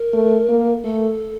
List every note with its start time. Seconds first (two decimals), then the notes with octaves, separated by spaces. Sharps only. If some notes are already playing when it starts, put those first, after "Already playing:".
Already playing: A#4
0.13 A3
0.49 A#3
0.84 A3 A4